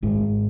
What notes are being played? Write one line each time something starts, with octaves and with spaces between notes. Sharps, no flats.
G#1 G#2